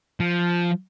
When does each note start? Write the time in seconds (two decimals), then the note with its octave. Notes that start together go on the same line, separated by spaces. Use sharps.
0.20 F3